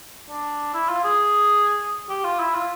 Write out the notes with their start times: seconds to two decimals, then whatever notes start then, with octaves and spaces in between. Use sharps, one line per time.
0.30 D4
0.74 E4
0.89 F4
1.04 G#4
2.09 G4
2.24 F4
2.39 E4
2.55 F4